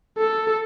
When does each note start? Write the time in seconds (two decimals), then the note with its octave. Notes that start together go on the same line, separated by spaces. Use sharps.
0.18 A4